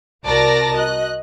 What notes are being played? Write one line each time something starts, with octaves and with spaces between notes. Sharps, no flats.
C2 F#4 A#4 D5 A5 A#6
F#4 D#5 F#6